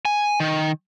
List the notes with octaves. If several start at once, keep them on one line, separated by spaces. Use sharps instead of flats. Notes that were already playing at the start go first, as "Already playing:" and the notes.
G#5
D#3